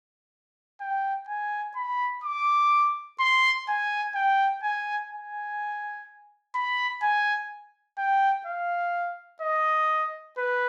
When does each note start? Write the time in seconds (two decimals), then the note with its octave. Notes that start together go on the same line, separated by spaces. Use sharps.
0.81 G5
1.29 G#5
1.76 B5
2.24 D6
3.20 C6
3.69 G#5
4.15 G5
4.64 G#5
5.11 G#5
6.55 B5
7.03 G#5
7.98 G5
8.46 F5
9.42 D#5
10.38 B4